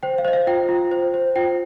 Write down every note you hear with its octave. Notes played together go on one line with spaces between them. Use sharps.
C5 G5
F5
C5 D#5
F5
F4 G5
F4
C5
C5
F4 G5